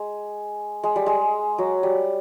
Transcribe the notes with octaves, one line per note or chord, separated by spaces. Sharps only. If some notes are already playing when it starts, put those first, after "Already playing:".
Already playing: G#3
G#3
G3
G#3
F#3
G3